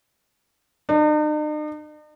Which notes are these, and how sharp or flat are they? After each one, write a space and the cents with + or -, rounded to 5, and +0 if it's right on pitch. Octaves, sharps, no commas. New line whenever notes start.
D#4 -45